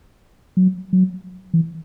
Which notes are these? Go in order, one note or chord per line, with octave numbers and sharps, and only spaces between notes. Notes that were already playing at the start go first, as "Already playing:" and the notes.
F#3
F#3
E3